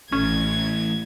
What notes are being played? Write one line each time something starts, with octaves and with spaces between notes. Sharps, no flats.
A1 E3 A3 C#4 G#6